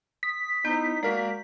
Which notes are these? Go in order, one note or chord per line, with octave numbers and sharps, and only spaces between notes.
D#6 B6
B3 D#4 E4 C5 G6
G#3 A#3 F#4 A#4 D5